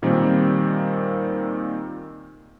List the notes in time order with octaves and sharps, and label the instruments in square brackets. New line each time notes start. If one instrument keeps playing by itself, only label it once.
[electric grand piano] A#2 D#3 G3 A#3 C4